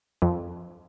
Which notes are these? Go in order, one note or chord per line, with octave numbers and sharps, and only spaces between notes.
F2